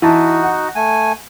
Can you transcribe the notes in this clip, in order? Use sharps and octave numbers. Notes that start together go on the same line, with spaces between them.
E3 D#4 F#4 A5
F#5
A3 G#5